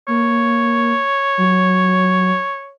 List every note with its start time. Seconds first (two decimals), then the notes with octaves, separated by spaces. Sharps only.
0.08 A#3 C#5
1.38 F#3